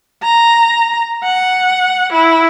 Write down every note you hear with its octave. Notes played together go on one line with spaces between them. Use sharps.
A#5
F#5
E4